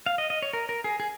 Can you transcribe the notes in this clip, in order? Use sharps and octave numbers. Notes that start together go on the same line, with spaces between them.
F5
D#5
D#5
C#5
A#4
A#4
G#4
G#4